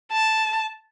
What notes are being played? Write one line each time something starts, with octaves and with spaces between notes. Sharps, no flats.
A5